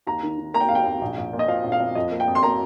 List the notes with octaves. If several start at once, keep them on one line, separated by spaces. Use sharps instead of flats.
D#2 A#5
D#3
D#3
A#3 A#5
G5
D#2 F5
G5
D#2
A#1
A#1
A#2
D#5
F3 F5
A#1
F5
F3
F2 D#5
A#3
G5
F2
C6
A#3 A#5